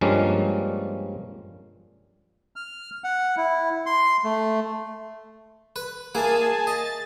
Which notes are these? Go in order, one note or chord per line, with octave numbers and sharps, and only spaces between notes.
G2 F3 G3 G#3 A#3 C#4
F6
F#5
E4
C6
A3
B4
A#3 E4 G#4 G#5 A5
D#5 A6